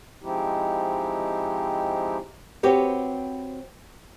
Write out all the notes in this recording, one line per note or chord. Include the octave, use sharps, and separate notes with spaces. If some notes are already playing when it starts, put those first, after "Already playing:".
F3 G#3 C4 D#4 E4 G4
C4 F#4 G4 B4 C#5